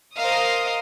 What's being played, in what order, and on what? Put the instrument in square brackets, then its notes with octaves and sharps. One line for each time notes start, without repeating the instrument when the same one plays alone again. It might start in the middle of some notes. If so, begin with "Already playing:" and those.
[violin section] A#4 C5 D#5 F5 D#6